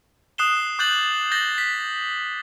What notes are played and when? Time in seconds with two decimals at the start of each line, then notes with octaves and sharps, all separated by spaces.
0.38 D#6 F#6 C7 E7 G7
0.79 D6 F#6 G6 A6 F#7
1.31 G6 A6 A#6 F#7 G7
1.58 B6